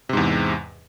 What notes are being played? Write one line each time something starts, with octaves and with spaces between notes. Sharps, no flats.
E2 G#2 C3